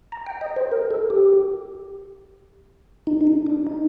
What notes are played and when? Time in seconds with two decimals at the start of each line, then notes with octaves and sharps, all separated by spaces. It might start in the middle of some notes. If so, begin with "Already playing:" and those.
0.12 A#5
0.27 G5
0.41 D#5
0.56 C5
0.72 A#4
0.91 A4
1.10 G4
3.07 D#4
3.21 D#4
3.27 D4
3.46 D4
3.67 D#4